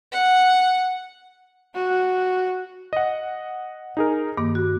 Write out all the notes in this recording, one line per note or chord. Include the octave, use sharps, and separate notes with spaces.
F#5
F#4
D#5 F#5
D#4 G#4 A#4
G2 D#3 A#3 D6
F#4